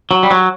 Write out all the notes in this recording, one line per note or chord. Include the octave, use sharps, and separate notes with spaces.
F#3
G3
F#3